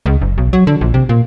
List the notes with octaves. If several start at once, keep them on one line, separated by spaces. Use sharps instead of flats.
C#2
F#1
B1
F#3
D3
A#1
C3
A#2